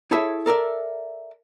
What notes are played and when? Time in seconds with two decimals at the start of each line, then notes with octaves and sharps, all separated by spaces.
0.11 E4 G#4 A4 C#5 E5
0.46 A4 A#4 D5 E5